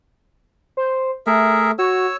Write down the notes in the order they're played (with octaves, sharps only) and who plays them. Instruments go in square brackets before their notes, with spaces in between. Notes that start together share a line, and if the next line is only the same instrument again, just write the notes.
[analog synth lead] C5
[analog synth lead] A3 [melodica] G#4 A#4 E5
[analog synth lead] F#4 [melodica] C#5 E6